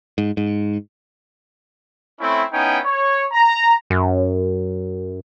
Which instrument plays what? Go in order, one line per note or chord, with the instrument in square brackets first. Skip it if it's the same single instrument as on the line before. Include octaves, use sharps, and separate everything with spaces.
[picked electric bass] G#2
G#2
[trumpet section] A3 C4 C#4 E4
B3 C#4 D#4 E4 G5
C#5
A#5
[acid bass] F#2